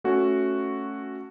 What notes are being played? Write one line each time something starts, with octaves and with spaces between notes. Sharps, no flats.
A3 C#4 F#4